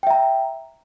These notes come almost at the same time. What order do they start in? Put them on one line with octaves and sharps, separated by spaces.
G5 E5 A#5